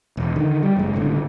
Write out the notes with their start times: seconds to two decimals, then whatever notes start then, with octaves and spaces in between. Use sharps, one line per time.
0.17 E1
0.36 D3 D#3
0.63 G3
0.76 F#1 G#3
0.94 G1 C#2 A2 D3